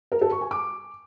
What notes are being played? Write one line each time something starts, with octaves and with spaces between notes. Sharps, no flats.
A#4
A4
C#6
G#5
D6